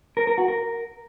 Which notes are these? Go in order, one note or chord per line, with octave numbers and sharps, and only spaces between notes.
A#4
A#4
F#4
A#4